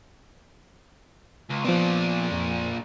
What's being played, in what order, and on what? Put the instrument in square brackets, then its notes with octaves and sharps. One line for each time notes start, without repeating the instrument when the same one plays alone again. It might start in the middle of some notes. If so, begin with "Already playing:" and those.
[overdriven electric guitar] C#2
[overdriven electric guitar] A#2 D4 [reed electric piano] F3 B3
[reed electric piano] F2